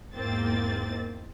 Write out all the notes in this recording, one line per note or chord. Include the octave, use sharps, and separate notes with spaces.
E2 G#2 A#3 C4 A6